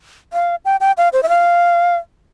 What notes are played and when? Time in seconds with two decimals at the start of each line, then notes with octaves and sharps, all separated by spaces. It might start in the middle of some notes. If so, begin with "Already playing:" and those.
0.33 F5
0.65 G5
0.81 G5
0.98 F5
1.13 C5
1.23 E5
1.29 F5